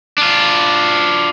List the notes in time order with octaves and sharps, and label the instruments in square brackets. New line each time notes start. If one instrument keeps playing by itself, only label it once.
[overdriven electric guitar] D4 F4